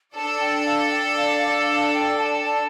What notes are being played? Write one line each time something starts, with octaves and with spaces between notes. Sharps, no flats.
D4 A4 D5 A5
G5
F5
G5
F5
F5
F5
G5
A5
A5